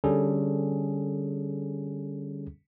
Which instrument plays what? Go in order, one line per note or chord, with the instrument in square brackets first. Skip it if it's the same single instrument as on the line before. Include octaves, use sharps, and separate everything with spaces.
[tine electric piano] D3 G3 C#4 G#4 A4